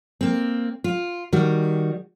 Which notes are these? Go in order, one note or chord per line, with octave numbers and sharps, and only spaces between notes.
A#3 C4
F4
D#3 G3 F#4